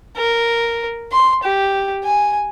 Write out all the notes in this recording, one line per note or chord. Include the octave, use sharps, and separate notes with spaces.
A#4
C6
G4
G#5